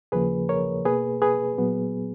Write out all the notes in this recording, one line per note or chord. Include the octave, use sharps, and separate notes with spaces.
D#2 C#3 F3 A#3 G#4 B4
A#4 C#5
B2 A#3 G#4 B4
G#4 B4
A#2 F#3 B3